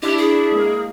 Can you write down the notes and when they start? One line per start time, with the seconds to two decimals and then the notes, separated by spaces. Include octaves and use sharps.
0.02 D4 E4 G4
0.18 G#4
0.52 G#3 A#3